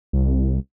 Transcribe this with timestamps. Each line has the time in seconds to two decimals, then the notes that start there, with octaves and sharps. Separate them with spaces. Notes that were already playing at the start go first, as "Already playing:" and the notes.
0.13 C2